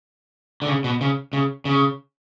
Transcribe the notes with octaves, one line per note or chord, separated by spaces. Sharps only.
D3
C#3
B2
C#3
C#3
C#3